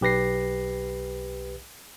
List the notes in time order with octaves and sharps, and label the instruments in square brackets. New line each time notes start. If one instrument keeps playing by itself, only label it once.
[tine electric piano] B1 G4 B4 A#6 C7